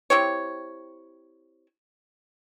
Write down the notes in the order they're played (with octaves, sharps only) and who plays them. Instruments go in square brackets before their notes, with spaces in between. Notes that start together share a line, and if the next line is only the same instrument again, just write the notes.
[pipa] C4 E4 G4 C#5